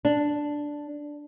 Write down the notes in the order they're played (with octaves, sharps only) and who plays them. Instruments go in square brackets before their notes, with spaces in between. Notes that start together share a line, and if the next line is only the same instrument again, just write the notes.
[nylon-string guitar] D4